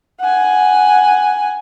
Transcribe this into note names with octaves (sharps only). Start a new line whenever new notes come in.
F#5 G#5